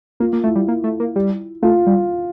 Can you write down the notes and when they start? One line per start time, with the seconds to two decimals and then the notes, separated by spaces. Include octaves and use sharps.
0.20 A#3 F4
0.33 A#3
0.44 A3 E4
0.55 G3
0.68 A#3
0.84 A3
1.00 A#3
1.16 G3
1.63 A3 F4
1.87 G3